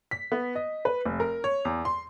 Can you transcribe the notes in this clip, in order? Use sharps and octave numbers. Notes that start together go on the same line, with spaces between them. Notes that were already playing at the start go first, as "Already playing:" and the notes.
B6
B3
D#5
B4
F1
A#4
C#5
E2
C6